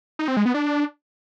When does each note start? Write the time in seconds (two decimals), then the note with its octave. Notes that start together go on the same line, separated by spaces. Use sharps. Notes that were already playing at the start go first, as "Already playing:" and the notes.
0.19 D#4
0.28 C4
0.37 G#3
0.46 B3
0.54 D4